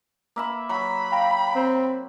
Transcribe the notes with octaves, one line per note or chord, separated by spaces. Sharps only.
A#3 E5 B5
F#3 B5
F5 G5 A#5
C4